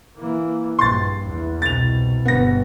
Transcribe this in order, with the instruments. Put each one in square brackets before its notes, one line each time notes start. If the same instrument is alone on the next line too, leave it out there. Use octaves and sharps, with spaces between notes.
[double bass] E3 A#3
[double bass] A#1 G2 [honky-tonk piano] C6 A6
[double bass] E2
[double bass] C2 B2 [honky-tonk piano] A6 F7
[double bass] G1 [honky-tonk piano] B3 A#6